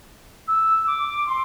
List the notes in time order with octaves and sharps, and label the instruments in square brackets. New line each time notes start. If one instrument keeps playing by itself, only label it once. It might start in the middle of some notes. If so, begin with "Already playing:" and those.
[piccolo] E6
D6
C6